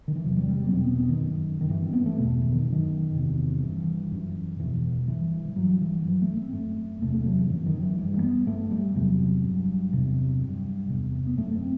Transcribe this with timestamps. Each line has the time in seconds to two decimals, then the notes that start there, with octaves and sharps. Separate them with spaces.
0.08 D#3
0.15 E3
0.24 E2 C3 F#3
0.36 G3
0.49 G3
0.60 F#3
0.66 B3
0.72 E2 B2 C4
0.84 B3
0.97 B3
1.09 D#3
1.21 F#2
1.61 D#3
1.69 G2 E3
1.82 C4
1.93 B3
2.06 A3
2.18 E2 B2
2.42 E3
2.52 D#3
2.66 F#2
2.72 D#3
3.14 E2 C3
3.63 G2 E3
4.12 F#2
4.59 E2 B2 E3
5.02 F#3
5.08 G2 E3
5.48 E3
5.56 G2 F#3
5.81 E3
6.05 G2 F#3
6.22 A3
6.37 C4
6.53 F#2 A3
7.02 E2 C3 A3
7.14 A3
7.26 F#3
7.38 E3
7.50 F#2 E3
7.66 D#3
7.76 F#3
7.83 E3
7.99 G2 G3
8.17 A3
8.22 B3
8.47 G2 A3
8.71 G3
8.95 E2 C3 F#3
9.44 G2
9.92 E2 C3
10.40 G2
10.89 E2 C3
11.27 B3
11.37 F#2 A3
11.54 C4